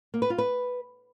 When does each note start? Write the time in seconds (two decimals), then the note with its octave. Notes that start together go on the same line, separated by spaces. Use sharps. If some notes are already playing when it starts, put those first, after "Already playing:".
0.14 A#3
0.22 B4
0.30 F4
0.38 B4